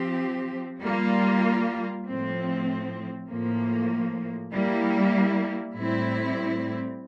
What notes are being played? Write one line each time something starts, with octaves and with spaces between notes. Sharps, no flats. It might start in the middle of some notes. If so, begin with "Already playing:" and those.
Already playing: F3 C4 G4
G3 A#3 F4
A2 F3 C4
A2 F3 A#3
G3 A#3 E4
A2 G3 C4 E4